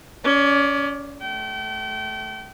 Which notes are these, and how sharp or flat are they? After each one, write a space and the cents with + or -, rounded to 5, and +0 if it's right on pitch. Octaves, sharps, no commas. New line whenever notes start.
C#4 +25 D5 +0
A3 -25 G5 -35